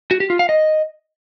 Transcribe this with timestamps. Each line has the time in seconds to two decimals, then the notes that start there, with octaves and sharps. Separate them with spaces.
0.11 F#4
0.20 G4
0.30 F4
0.39 F5
0.49 D#5